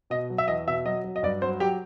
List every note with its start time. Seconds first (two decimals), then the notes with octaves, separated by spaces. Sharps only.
0.10 B2 D#5
0.30 F#3
0.38 E5
0.48 E2 D#5
0.67 B2 E5
0.85 F#3 D#5
1.04 F#3
1.16 D#5
1.23 G2 D5
1.42 F#3 C5
1.60 F#3 G4